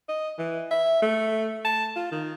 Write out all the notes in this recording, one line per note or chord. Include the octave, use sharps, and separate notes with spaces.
D#5
E3
E5
A3
A5
F4
D#3